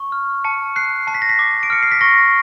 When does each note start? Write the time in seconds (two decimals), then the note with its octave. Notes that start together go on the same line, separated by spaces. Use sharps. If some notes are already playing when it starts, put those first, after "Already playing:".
Already playing: C#6
0.12 F6
0.44 A5 C#7
0.76 F#6 C7
1.07 A5 C7
1.14 B6
1.22 A#6
1.29 B6
1.39 D6
1.63 D7
1.70 F6 C#7
1.83 C7
1.92 B6
2.01 C#6 A#6